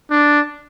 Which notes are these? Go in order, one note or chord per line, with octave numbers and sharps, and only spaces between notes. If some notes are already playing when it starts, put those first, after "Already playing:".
D4